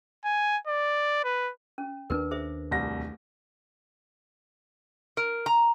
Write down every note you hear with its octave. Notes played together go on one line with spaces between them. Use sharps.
G#5
D5
B4
C#4
D#2 C4 D4 A#4 B4
G#4 C5 E5
D1 C2 A#6
A#4
A#5